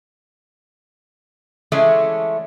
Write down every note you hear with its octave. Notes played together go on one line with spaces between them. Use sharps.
E3 G#3 A3 C#4 D5